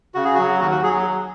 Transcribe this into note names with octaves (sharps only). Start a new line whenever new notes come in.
C#3 F#4
G#4
F#3 F#4
D#2 F#4
F#4
F#3 G#4